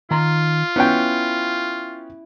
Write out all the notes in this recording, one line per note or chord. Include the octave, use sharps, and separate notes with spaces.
D#3 F4 A#5 C6
B3 C#4 E4 G5